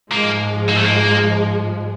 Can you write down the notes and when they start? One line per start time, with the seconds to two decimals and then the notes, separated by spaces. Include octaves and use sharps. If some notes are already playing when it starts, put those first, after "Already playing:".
0.11 G#2 F3 G#3 A#3
0.69 A#3
0.77 A3
0.85 A#3